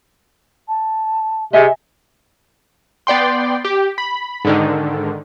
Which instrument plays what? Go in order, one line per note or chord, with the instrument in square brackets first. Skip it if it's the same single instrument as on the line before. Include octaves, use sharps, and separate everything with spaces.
[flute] A5
[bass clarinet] C3 [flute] G#4 [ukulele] D#5 E5 G#5
[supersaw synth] B3 D5 G5 C6
G4
B5
G#2 D3 D#3